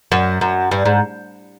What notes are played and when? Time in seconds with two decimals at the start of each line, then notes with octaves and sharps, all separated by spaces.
0.12 F#2
0.41 F#2
0.71 G2
0.85 G#2